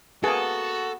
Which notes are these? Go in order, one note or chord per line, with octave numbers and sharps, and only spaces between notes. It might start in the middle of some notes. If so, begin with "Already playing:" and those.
A#3 B3 F#4 G#4 A4